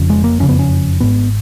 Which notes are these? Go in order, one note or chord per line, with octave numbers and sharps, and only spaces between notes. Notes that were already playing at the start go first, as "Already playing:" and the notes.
Already playing: F1 F2 C#3
G#3
A#3
F#1 F2 C#3 C#4
B3
C#4
G#1 G#2 B3